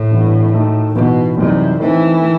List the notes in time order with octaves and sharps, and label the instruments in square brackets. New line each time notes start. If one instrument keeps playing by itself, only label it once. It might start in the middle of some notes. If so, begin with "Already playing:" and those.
Already playing: [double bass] A2
[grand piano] G2 E3 B3 E4
D#3 A3 D#4 F#4
[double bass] B2 [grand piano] E3 B3 D#4 F#4
[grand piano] F#2 E3 G3 D#4 [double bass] C3
[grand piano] D#3 A3 C4 D#4 [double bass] E3
[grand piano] D#3 A3